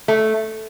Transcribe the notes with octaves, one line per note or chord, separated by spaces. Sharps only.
A3